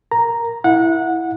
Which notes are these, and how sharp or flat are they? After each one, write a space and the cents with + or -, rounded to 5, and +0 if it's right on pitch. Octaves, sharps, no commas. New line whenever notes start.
A#4 +0 A#5 +0
E4 +0 F#5 -20